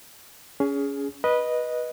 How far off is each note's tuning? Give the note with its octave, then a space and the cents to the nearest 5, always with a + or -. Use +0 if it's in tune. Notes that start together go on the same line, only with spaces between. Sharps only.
C#4 +25 G#4 +0
B4 -15 D#5 +0